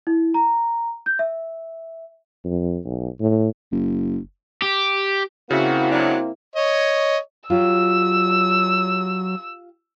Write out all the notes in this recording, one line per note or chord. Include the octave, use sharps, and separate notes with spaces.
E4
A#5
G6
E5
F2
B1
A2
F#1
G4
C#3 A#3 C4 E4 F#4 E5
F#3 D4
C#5 D#5
F#3 F4 G4 E6